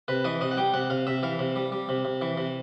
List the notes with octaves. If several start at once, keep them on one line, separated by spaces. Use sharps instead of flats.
C3 B4
E3 D#5
C3 D#5
F#5
G3 G5
C3 F#5
C3 F5
C3 E5
E3 F5
C3
G3
G3
C3
C3
E3
C3